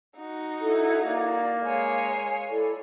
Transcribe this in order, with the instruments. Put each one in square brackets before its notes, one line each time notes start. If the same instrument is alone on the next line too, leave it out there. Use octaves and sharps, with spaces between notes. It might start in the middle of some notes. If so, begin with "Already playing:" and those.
[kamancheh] D#4 F#4
[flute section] E4 A4
[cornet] A#3 [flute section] D5
[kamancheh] G#3 C#5 [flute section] F5 G#5
[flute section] E4 A4 D5